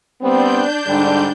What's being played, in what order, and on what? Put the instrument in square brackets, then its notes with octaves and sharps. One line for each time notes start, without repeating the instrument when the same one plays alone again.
[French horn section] G3 B3 C4 [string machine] D4 G6
[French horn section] G#2 D3 G3